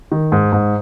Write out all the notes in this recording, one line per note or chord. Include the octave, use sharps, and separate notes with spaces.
D#3
G#2
G#2